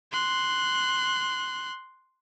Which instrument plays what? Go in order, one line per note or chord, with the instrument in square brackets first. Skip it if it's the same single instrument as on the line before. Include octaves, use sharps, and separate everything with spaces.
[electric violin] C6 F#6